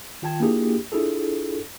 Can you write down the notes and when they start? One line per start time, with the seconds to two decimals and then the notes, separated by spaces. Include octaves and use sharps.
0.22 D#3 F4 G5 A5 G#6
0.40 A#3 D4 E4 F4 G4 G#4
0.92 D4 E4 F4 G#4 A4